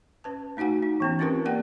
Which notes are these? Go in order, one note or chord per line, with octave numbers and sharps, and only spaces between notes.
C#4 B4 A5
A3 D#4 F#4 F#5 G#5
D#4
E3 B3 C#4
C4 C#4 F4 G4 A#4 B4
A#3 D5 F#5 G5